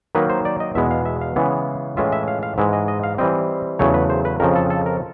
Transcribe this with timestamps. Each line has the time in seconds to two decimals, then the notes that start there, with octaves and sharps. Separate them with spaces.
0.15 D#3 F#3 A#3 D#4 B4
0.30 C5
0.45 D5
0.60 D#5
0.75 E2 B2 G#3 B3 E5
0.91 F5
1.05 E5
1.21 F5
1.36 C#3 E3 G#3 B3
1.97 A2 E3 G#3 C#4 F4 E5
2.12 E5
2.28 F5
2.43 F5
2.58 G#2 E3 G#3 E5
2.73 D#5
2.88 D#5
3.03 F5
3.18 E3 G3 C4 D#5
3.79 E2 C#3 F#3 A3 C#5
3.94 B4
4.10 C5
4.25 B4
4.40 F2 C#3 F3 A#4
4.55 A4
4.70 A4
4.86 A#4